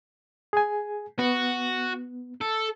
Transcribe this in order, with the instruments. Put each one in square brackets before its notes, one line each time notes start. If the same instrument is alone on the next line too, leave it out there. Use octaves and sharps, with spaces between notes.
[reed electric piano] G#4 G#5
[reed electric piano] B3 [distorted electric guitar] F#4
[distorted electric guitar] A4